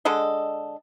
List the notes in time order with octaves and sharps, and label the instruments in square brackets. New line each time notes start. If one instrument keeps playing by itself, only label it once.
[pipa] D3 G#3 A4 D#5